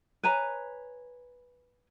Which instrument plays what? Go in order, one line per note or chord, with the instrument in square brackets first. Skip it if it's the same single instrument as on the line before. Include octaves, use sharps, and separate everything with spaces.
[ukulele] B4 C#5 G#5 A#5